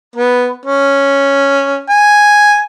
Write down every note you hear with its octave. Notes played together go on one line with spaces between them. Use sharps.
B3
C#4
G#5